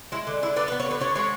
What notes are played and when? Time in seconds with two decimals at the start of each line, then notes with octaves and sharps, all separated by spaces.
0.12 G#3 E4
0.27 D3
0.42 D3 E4
0.56 B3 D4
0.68 B4
0.72 B3
0.80 C#5
0.86 D3 B4
1.00 D3 C#5
1.16 G#3 C#5